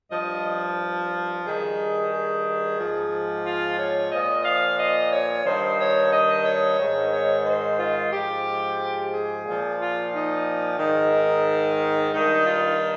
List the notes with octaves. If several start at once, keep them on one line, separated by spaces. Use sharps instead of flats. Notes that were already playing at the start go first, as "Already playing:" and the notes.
G2 F3 D#5
G2 D#3 G#4
G#4
G#2 F3
F4
C#5
A#2 F3 D#5
F5
D#5
C#5
G2 D#3 C5
C#5
D#5
C#5
G#2 D#3
C#5
C5
F4
G#2 F3 G4
G#4
A#2 F3
F4
D#4
G#2 D#3
D#4
G2 D#3 D#4
F4